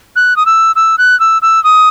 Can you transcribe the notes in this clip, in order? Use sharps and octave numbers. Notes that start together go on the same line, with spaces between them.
F#6
D#6
E6
E6
F#6
E6
E6
D#6